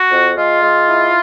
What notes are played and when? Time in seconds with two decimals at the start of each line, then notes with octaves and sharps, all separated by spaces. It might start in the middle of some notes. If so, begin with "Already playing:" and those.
Already playing: F#4
0.11 F2
0.37 G#3 F4
0.63 G#3
0.88 E4